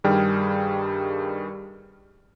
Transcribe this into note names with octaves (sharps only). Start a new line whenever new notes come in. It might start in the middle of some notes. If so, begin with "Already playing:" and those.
G2 D#3 G3 G#4 G5 F6